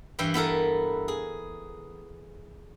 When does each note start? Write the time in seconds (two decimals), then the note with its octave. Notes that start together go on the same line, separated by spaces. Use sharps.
0.19 G2 E3 E4 G5
0.34 B3 E4 A4 A#4
1.08 G#4